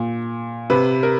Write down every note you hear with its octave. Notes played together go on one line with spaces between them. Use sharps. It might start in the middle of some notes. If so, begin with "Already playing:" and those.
Already playing: A#2
C3 B4
A#4